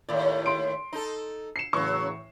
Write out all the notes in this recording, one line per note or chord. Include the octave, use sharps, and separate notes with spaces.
D#2 A2 C#5 D5
C6 D7
D#4 A4
C7 C#7 E7
A2 C#3 E3 F#3 C#6